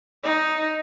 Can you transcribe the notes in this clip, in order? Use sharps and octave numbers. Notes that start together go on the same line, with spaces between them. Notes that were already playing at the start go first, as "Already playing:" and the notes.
D#4